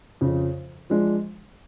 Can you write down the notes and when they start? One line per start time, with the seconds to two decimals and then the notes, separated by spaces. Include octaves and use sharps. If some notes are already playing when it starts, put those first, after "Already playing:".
0.21 F2 C#3 F3
0.90 F3 G#3 D4